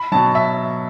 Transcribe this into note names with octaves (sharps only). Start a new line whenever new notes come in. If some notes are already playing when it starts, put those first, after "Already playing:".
Already playing: B5
B2 F#3 A5
E5